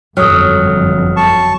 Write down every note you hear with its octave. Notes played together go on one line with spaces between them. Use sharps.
G1 F2 F#3 A4 D#6 F6
A5 C#6